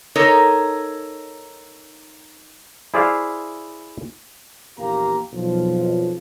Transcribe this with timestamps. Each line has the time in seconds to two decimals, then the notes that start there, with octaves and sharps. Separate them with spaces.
0.15 D#4 A4 A#4 C#5
2.94 E4 G#4 C5 D5 E5 F5
4.78 A#1 E2 A#3 G4 F5 A#5
5.33 B1 F2 F3